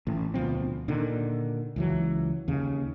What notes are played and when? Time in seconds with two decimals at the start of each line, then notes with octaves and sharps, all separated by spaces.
0.07 A1 A2
0.34 D2 B2 F3 C4
0.88 A#2 D3 D#3
1.76 C#2 E3 F#3
2.48 D#2 C#3